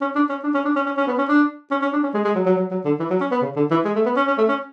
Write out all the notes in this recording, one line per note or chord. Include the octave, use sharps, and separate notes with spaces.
C#4
D4
C#4
D4
C#4
D4
C#4
C#4
C#4
B3
C#4
D4
C#4
C#4
D4
C#4
G#3
G#3
F#3
F#3
F#3
F#3
D3
E3
F#3
C#4
B3
C#3
D3
E3
G#3
A3
B3
C#4
C#4
A3
C#4